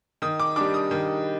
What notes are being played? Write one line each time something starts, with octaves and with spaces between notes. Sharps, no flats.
D#3 D#6
D6
G3 D4 D6
D#6
D#3